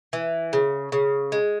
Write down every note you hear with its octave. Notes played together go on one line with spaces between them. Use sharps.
E3
C#3
C#3
G#3